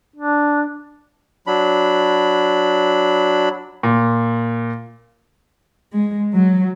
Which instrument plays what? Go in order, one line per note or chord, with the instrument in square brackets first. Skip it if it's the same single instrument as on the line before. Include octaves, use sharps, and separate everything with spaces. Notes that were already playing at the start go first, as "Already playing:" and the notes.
[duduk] D4
[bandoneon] F#3 D4 B5
[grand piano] A#2
[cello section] G#3
F#3